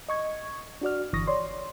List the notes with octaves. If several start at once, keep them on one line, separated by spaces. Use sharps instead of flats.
D#5 C#6 G#6
D4 F#4 D5 F6
G1 D3 E3 C#6 D#6 A#6
C#5 D5 C6